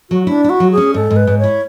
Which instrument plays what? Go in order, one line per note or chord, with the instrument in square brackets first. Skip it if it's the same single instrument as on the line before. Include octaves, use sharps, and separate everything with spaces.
[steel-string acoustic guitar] F#3 [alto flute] F#4
[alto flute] D4 [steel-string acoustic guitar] E4
[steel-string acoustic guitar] E4
[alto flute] F#4
[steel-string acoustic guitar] F#3
[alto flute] G#4
[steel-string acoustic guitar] C#4
[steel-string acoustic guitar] G#2 [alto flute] A4
[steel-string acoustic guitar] G#2
[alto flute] B4
[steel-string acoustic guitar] G#2
[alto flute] C#5
[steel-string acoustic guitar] E4